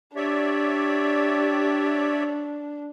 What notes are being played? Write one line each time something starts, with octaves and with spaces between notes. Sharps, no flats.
D4 G4 C#5 D5 E5